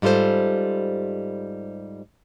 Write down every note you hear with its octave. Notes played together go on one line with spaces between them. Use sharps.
G#2 G3 F4 A4 C5